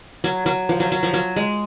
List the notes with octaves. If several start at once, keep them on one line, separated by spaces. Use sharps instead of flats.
F#3
F#3
F3
F#3
F#3
F3
F#3
G#3